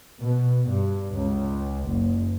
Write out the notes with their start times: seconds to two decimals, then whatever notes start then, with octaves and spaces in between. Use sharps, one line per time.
0.19 B2
0.68 G2
1.14 C#2
1.86 F#1